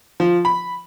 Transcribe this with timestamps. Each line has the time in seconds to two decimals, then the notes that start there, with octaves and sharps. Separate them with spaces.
0.20 F3
0.45 B5